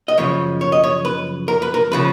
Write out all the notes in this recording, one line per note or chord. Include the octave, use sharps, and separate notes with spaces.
D#5
F#2 C#3 F3 C#5
C#5
D#5
C#5
B4
A#4
B4
A#4
C#3 F3 B4